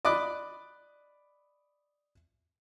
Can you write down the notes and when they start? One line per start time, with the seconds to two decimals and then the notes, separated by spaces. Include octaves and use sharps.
0.05 D5 D#5 B5 D6 F#6